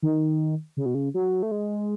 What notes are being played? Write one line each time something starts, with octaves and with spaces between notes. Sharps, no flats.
D#3
C#3
B2
C#3
F#3
A3
G#3